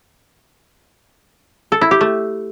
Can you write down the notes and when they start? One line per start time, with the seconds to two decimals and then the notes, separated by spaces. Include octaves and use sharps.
1.72 A4
1.81 E4
1.91 G4
2.01 A3